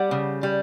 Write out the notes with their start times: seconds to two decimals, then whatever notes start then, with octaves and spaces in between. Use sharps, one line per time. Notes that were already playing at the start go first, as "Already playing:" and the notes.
Already playing: G3 D5 F#5
0.11 C#3
0.43 G3